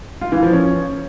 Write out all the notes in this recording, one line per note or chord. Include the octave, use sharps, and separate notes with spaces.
F4
E3
F3
C#4